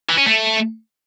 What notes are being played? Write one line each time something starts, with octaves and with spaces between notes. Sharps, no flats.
E3
C#4
A3